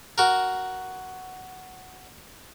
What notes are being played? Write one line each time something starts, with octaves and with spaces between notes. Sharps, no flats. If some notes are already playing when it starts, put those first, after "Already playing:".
F#4 A#4